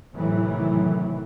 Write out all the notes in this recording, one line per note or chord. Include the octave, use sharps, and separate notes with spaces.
A2 C3 D#3 E3 F#3